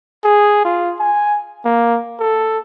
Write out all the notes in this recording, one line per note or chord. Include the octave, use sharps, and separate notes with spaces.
G#4
F4
G#5
A#3
A4